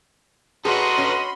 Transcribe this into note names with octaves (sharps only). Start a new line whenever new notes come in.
F#4 G#4 A4 B4 D#5 B5 C6
C#4